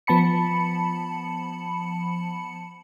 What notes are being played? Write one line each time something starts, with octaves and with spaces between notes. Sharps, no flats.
F3 B3 A5 B5 C#7